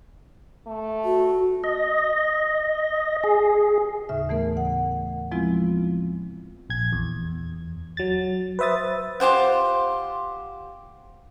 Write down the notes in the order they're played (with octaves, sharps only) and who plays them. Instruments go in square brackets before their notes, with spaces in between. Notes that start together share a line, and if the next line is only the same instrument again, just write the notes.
[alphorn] A3
[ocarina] F#4
[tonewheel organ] D#5
G#4
[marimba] D#2 A2 C#3 E5
E3 A3 B3 A#4
F#5
F3 G#3 B3 C4 E4 F4
[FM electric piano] A#1 G#6
E2
F#3 A6
B4 C5 E5 D#6 A6
[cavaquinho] F4 G4 C5 F#5